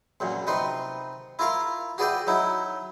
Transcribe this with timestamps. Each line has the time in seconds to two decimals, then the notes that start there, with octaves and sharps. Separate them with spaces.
0.20 A#1 F#2 A#2
0.47 C3 D#4 B4 C6
1.39 E4 F4 A#4 F5
1.98 F#4 G#4 B4 D5 E5 G5
2.27 F#3 D#4 E4